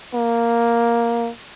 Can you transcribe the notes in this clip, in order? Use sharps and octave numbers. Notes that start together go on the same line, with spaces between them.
A#3